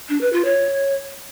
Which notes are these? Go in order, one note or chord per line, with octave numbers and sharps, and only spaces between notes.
D4
B4
F4
C#5